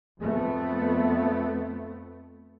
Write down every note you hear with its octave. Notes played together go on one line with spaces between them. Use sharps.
F2 A3 B3